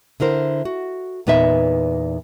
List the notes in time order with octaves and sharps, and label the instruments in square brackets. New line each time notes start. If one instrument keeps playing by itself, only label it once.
[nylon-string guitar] D3 E4 A#4 C5
F#4
E2 A#2 B3 D#4 B4 E5